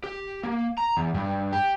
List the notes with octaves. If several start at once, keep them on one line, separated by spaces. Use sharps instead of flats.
G4
A#3
A#5
E2
G2
G4